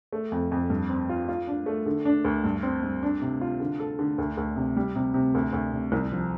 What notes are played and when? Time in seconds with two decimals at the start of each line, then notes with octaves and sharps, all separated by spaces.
0.12 A3
0.32 F2
0.52 F2
0.70 G2
0.89 C4
1.09 F4
1.29 F4
1.47 D4
1.66 A3
1.86 D3
2.05 D4
2.25 D2
2.44 G2
2.63 C4
2.83 G2
3.03 D4
3.22 C3
3.41 F4
3.60 D3
3.80 A4
3.99 D3
4.18 D2
4.37 D2
4.56 C3
4.77 G3
4.96 C3
5.14 C3
5.35 D2
5.53 D2
5.73 C3
5.92 C2
6.12 F3